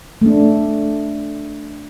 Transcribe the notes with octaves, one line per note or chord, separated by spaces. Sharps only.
A3 D4